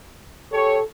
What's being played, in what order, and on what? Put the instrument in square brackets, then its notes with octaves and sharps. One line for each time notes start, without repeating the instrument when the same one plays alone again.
[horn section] G4 C#5 [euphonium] A4